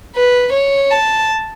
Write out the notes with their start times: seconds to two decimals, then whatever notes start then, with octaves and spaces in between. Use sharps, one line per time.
0.16 B4
0.53 C#5
0.91 A5